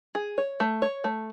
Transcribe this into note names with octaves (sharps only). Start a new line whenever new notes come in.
G#4
C#5
A3
C#5
A3